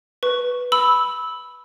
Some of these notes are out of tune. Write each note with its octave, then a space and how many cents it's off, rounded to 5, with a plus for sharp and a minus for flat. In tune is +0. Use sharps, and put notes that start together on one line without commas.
B4 +0 C#6 +0
B5 +0 E6 -15